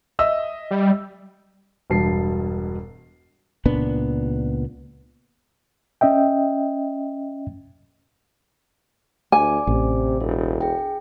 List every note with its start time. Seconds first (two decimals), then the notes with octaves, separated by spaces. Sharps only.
0.19 D#5 E5 E6
0.71 G3
1.90 E1 G2 B2 A5 C7
3.65 C#2 A#2 B3 D4
6.01 C#4 D#5 E5 G5
9.32 D2 D5 G#5 D6
9.67 A1 C3
10.21 E1 A4
10.61 G#4 G5